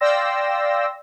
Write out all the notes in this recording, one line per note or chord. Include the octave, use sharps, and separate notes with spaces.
D5 F5 G5 C6 E6 A#6